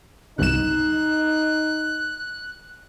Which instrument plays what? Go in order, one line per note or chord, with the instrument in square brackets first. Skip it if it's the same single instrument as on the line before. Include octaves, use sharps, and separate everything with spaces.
[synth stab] G1 C2 E7 [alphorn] D#4 [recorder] F#6